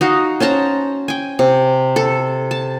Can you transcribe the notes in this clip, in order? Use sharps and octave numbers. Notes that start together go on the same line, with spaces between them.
D#4 F#4 D#5 F5
C#4 C5 A5 A#5
G5 G#5
C3
A4
A5